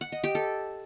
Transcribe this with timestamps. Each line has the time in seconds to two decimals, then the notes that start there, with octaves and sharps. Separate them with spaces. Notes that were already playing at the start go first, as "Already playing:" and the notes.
0.01 F#5
0.12 D#5
0.24 G4
0.35 A4